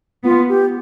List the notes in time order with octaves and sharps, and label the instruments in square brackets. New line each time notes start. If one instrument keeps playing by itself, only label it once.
[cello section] B3 [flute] F4
[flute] G4